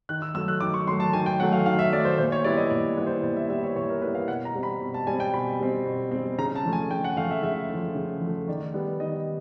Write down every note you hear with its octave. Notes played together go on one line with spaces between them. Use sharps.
D#3 F#6
E6
F#3 A3 E6
F#6
D#3 D6
C#6
F#3 A3 C6
A5
D#3 G#5
G5
F#3 A3 F#5
F5
D#3 F5
E5
F#3 A3 D5
C5
A#2 C5
C#5
G3 B3 E4 D5
D#5
A#2 D5
G3 B3 E4
C5
A#2 D5
E5
G3 B3 E4 E5
C#5
A#2 C#5
A#4
G3 B3 E4 B4
F5
B2 F#5
A#5
G3 C4
B5
B2
A5
G3 G#5
C4
G5
B2 B5
G3 C4
B2
G3 C4
C#3 A#5
A5
F3 A3
G#5
C#3 G5
F#5
F3 A3 F5
E5
C#3 E5
F3 A3
C#3
F3 A3
D#3 D5
G3 B3
D#3 D#5